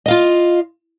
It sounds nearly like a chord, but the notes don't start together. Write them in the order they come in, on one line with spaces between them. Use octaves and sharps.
D#5 F5 F4